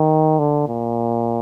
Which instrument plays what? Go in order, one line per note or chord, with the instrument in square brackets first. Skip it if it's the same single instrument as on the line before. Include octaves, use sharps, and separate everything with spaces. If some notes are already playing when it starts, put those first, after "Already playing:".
Already playing: [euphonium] D#3
D3
A#2